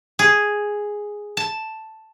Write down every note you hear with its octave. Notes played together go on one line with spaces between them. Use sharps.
G#4
A5